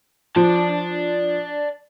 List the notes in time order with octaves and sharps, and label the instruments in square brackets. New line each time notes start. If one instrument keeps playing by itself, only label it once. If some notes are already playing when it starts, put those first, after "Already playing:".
[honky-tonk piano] F3 [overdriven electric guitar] D5 A5